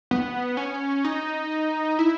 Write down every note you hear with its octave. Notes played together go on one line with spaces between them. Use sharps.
B3
C#4
D#4
E4